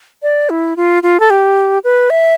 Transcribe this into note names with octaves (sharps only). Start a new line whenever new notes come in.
D5
E4
F4
F4
A4
G4
B4
E5